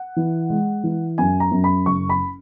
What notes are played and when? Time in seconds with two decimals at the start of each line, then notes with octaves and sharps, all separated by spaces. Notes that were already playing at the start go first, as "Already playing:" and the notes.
Already playing: F#5
0.16 E3
0.50 G#3
0.84 E3
1.18 F#2 G#5
1.40 A#5
1.51 F#2
1.64 B5
1.86 F#1 C#6
2.09 B5